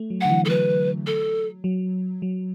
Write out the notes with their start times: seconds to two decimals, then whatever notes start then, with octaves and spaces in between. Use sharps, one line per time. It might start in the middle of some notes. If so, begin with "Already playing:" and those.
Already playing: A3
0.10 F#3
0.21 D3 F#5
0.30 E3
0.45 A4
0.49 F#3 B4
1.07 A4
1.64 F#3
2.22 F#3